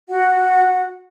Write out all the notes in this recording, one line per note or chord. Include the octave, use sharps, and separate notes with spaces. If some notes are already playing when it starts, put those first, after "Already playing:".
F#4 F#5